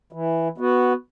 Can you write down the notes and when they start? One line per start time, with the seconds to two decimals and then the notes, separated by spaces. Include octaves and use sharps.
0.12 E3
0.58 B3 F#4